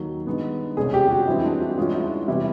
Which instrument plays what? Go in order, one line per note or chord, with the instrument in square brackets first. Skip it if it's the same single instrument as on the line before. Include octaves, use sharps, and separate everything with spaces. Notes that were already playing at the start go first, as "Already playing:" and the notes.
Already playing: [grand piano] D#2 D#3 F#3 A#3
G2 D#3 G#3 B3
[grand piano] C2 B2 G#3 C#4 [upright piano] G#4
[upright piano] G4
F#4
[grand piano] G2 E3 G#3 C4 [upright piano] E4
[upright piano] D4
F#4
[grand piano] G2 E3 G#3 C#4 F#4 [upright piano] F4
[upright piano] E4
[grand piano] C3 E3 G3 B3 [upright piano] E4